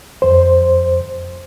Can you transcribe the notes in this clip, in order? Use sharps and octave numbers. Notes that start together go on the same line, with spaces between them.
F2 C5